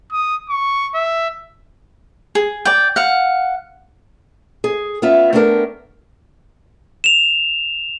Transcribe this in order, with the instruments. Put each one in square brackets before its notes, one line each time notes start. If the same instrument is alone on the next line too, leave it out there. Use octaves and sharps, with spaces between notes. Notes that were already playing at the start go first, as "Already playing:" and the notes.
[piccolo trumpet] D#6
C#6
E5
[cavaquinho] G#4
D5 G5
F5 F#5
[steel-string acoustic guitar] G#4
B3 C#4 F4 E5
A3 B3 C4 D4 G#4 A#4
[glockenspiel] E7 F7